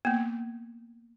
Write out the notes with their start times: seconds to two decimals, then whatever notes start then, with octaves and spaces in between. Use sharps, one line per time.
0.05 A#3 B3